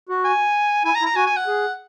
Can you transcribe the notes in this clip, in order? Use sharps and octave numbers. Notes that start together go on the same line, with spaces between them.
F#4
G#5
E4 G#5
A#5
E4
A#5
F#4 G#5
G#5
F#5
G#4